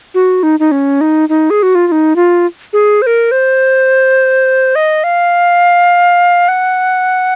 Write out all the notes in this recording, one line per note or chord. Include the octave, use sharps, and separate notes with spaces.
F#4
D#4
D#4
C#4
D#4
D#4
G#4
F#4
F4
F4
D#4
F4
G#4
C5
A#4
C5
D#5
F5
F#5